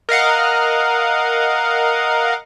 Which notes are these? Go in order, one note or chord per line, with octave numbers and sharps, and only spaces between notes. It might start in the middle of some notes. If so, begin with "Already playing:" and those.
A#4 D#5 F5 F#5